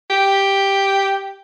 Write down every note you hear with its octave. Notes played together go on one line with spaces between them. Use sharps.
G4